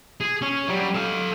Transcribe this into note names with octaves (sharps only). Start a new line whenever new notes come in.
G#4
C#4
F#3 G3
A4 F5